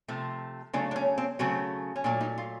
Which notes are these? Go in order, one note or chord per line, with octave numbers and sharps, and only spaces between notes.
C3 F3 A3
C#3 F#3 A3 D4
D4
C#4
C4
C#3 F#3 A3 C4
C#4
A#2 F#3 A3 D4
D#4
F4